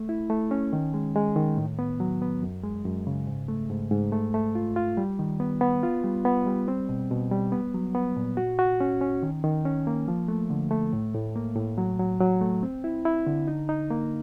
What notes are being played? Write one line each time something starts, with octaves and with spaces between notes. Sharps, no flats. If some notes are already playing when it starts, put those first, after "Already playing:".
Already playing: A3
E4
A3
C#4
D#3
G#3
G#3
D#3
A2
B3
F#3
B3
F#2
G#3
F#2
C#3
G#2
A3
G#2
G#2
A3
A3
F4
F4
G3
D#3
B3
B3
F4
G3
B3
G3
C4
B2
B2
G3
B3
F#3
B3
A#2
F#4
F#4
C#4
C#4
D#3
D#3
C#4
A#3
F3
A3
D3
A3
A2
A2
A#3
A2
F#3
F#3
F#3
A3
C4
E4
E4
D3
D#4
D#4
A#3